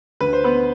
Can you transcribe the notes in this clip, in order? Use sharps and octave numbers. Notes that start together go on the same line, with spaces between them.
D2 B4
C5
B3 B4